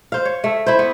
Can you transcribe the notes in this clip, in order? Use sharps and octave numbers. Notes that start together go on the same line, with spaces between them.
C5 F5
C#5
A3 E5
E4 C5
B3